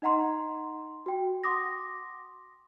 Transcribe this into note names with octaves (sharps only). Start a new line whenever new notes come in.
D#4 D#5 F#5 A#5 C6
F#4 G5
F#5 C6 D6 D#6 A#6